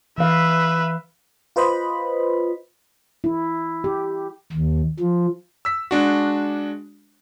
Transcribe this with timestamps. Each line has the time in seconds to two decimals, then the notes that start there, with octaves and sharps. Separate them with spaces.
0.18 E3 B4 E5 F5
1.56 F4 B4 C5 D#5 B5
3.24 E4
3.84 G4
4.52 D#2
5.00 F3
5.65 E6 B6
5.91 G#3 D4 F#4